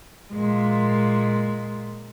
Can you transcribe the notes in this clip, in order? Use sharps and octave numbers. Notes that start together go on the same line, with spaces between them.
A#2 G#3